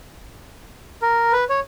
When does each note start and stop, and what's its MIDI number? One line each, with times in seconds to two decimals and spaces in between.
1.02 1.32 70
1.33 1.44 71
1.49 1.60 73